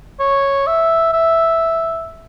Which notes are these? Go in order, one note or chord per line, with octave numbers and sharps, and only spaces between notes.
C#5
E5
E5